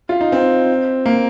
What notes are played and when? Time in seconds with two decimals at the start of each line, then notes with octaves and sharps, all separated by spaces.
0.09 F4
0.21 D#4
0.32 C4
1.06 A#3